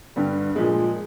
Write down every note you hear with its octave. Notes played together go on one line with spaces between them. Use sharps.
G2 D3 G3
A#2 F3 G#3